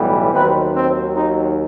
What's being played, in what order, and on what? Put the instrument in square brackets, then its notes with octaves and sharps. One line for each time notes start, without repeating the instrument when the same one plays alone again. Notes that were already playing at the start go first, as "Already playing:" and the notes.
Already playing: [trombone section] B1 A2 E3 G3 B3
D#2 D#3 F#3 C4 B4
C4
D#4